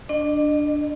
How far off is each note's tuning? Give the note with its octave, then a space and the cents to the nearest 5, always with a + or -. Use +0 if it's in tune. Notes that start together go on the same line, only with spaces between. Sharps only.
D4 +0 D#5 -40